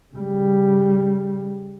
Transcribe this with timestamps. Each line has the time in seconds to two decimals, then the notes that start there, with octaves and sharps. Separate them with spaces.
0.14 C#3 G3